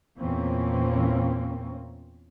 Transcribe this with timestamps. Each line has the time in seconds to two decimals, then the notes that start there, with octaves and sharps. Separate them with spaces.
0.20 E2 A#2 E3 A#3 C4 C#4